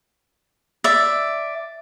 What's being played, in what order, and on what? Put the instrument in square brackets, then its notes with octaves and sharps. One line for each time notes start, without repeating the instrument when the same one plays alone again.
[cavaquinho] D5 E5